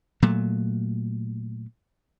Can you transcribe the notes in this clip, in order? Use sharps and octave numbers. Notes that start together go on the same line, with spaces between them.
A#2 F#3 A3